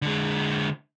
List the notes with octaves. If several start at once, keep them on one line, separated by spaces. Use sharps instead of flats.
D3 G#3